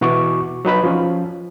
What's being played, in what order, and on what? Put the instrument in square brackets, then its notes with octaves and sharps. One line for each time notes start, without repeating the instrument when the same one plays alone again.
[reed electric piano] B2 E3 F#4 C#6 D6
F#3 D#4 B4 B5
F3 C#4